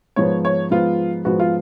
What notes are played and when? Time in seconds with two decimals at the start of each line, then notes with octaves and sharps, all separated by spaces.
0.16 G#2 F3 B3 C#5
0.45 C#5
0.71 G#2 F3 B3 F4
1.25 G#2 F3 B3 F#4
1.39 F4